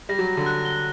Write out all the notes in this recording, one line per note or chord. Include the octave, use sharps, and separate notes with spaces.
G3 A#6
F#3
A#6
D3
F#6
G7